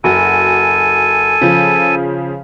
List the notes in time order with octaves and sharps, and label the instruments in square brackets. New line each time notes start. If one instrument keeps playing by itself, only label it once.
[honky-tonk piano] F#1 F#4 [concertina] A4 G#5
[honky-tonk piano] C#3 F3